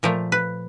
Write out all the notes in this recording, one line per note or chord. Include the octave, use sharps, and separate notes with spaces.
A#2 F3 A3 A#4
B4